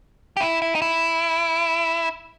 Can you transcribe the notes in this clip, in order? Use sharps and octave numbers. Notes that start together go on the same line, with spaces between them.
G4
E4
E4
D#4
E4